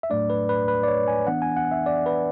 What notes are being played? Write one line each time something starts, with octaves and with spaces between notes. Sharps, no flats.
E5
A2 F#3 A3 D4 D5
B4
B4
B4
D5
C#5
G#5
E3 B3 D4 F#5
G#5
F#5
E5
D5
B4